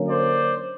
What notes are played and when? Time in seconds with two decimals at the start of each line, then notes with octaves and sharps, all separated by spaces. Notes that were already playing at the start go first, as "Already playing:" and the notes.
Already playing: D3 F#3 A#3 C#4
0.09 C5 D5